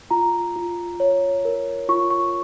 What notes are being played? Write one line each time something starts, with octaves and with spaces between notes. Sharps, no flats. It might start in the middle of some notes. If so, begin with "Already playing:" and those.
F4 A#5
F4
C#5
A#4
F4 C#6
C#6